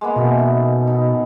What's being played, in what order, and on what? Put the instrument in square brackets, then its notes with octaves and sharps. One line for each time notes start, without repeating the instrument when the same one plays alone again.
[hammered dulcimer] G#3 A#3 B3
[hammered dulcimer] F#2 E3 A4 [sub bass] B2
[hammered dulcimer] D#4
B3 D#4